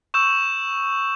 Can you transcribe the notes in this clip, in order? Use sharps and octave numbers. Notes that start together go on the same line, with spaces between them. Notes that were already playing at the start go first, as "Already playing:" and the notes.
C#6 E6 G6 E7